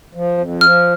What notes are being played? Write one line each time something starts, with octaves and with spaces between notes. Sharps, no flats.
F3
F2
F3 F6